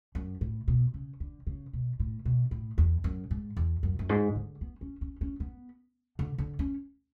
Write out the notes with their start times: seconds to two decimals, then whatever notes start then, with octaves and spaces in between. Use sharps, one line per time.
0.15 F#2
0.41 A2
0.68 B2
0.94 C#3
1.20 D3
1.47 C#3
1.73 B2
2.00 A2
2.25 B2
2.51 A2
2.78 E2
3.04 F#2
3.31 G#2
3.57 E2
3.83 F#2
3.99 F#2
4.09 G#2
4.35 D3
4.61 B3
4.81 C#4
5.01 C#4
5.21 C#4
5.40 B3
6.19 D3
6.38 D3
6.59 C#4